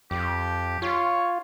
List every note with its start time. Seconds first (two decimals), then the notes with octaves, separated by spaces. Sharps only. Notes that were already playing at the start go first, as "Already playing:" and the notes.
0.11 F2 G4
0.82 F4 C#5